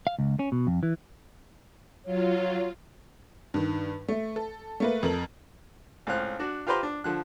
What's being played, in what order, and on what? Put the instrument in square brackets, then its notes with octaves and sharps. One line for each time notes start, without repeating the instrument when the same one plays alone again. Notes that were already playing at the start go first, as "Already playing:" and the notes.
[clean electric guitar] F5
C#2
C#4
B2
F2
E3
[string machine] F#3 F4 [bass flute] C#5
[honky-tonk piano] G2 D#3
A3
A4
A3 A#3 B4
F2 A4 A#4 F#7
[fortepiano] C#2 A2 C4 F5 F#6
D4 F#4
F4 G4 B4 C5 A#5 C6
D4
D3 F3 F#6